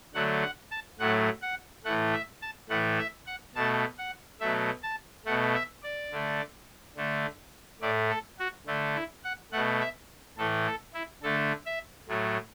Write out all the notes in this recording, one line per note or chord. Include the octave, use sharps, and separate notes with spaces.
D3 F#3 A3 F#5
F#5
A5
A2 F#3 A3 F#5
F#5
A2 E3 A3 F#5
E5
A5
A2 E3 A3 F#5
E5
F#5
B2 A3 A5
F#5
B2 F#3 A3 E5
A5
B2 A3 F#5
E5
D5
D3 A3
D3 A3
A2 A3 D5
A4
F#4
D3 A3
E4
F#5
B2 A3 F#5
E5
A2 E3 A3 A4
A4
E4
D3 A3 A4
E5
A2 F#3 A3